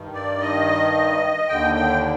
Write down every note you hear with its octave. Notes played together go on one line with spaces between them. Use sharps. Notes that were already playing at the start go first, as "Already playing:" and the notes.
Already playing: G2 D#3
D5
D#5
D#2 D3 G5
G5